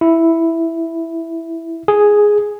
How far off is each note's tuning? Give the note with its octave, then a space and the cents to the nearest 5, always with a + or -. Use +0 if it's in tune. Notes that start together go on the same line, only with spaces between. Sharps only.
E4 +0
G#4 +0